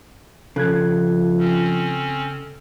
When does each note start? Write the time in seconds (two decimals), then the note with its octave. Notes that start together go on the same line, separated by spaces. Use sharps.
0.56 C#3 F3 A4 F#6 G#6
1.39 C4 C#4